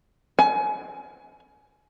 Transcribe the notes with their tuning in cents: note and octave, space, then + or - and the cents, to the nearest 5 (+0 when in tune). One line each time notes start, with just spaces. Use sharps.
G#5 +30